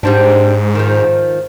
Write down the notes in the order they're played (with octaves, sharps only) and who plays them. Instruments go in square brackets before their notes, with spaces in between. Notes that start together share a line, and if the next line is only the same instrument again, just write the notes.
[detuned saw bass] G#2 [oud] G3 C4 D4
[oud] D#3 F3